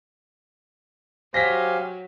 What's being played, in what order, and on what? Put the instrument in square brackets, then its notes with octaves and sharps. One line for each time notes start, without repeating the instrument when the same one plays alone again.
[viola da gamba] F#3 [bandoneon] G4 F5 G#5 [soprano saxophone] C5 [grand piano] A#6 B6